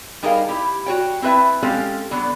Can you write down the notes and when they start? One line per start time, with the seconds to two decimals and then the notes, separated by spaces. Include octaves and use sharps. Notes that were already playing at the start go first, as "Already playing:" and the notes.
0.23 G3 D#4 G#4 A#4 D5 F5
0.48 E4 G4
0.86 F#4 C#5 G5
1.22 C4 E4 B4 E5 A5
1.63 G#3 C4 C#4 F4 G4 A4
2.11 D3 F#3 B3